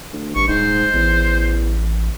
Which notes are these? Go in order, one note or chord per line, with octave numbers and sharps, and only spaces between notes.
D2
G#1 G2 C#6
D#1 G#2 C5
A1 E2